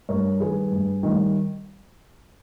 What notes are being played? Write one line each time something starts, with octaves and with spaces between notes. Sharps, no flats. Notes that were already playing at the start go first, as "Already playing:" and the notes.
G2 A#4 C#5
D#3 G3 G#4 B4
G2
D#3 G3